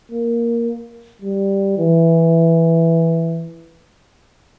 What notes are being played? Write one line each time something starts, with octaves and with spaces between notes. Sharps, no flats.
A#3
G3
E3